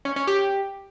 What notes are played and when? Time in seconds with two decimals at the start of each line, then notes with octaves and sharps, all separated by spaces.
0.05 C#4
0.16 C#4
0.27 G4
0.39 G4